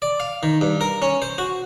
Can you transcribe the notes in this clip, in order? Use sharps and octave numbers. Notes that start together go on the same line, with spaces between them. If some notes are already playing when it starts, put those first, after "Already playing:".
D5
F5
D#3
G2
A#4
C#4
C5
F#4